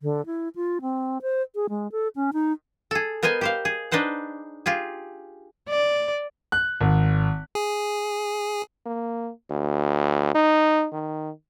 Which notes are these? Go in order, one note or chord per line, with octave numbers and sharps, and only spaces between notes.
D3
E4
F4
C4
C5
G#4
G#3
A4
C#4
D#4
G#4 A4
B3 A#4 C5 D#5 G#5
G4 C5 F5
G#4
D4 D#4 B4 C5 F#5
F4 G4 G#4
D5
F#6
G#1
G#4
A#3
D2
D#4
D#3